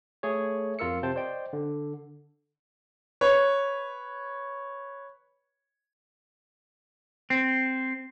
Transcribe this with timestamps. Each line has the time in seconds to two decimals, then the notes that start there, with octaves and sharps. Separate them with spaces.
0.23 A3 G#4 A4 C#5
0.79 F2 F4 A#4 E6 C#7
1.03 C3 C5 G5 A5
1.16 C5 D5 D#5 G5
1.53 D3
3.21 B4 C#5
7.30 C4